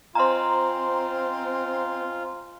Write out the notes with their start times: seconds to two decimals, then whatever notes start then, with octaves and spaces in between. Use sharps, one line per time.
0.15 C4 F4 C5 D#5 G#5 A#5 C6